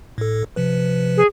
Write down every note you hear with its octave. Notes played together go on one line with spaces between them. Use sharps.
A2 A4
C3 F3 B4
G#4